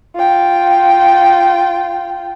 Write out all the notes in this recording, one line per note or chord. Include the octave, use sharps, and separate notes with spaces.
F4 G5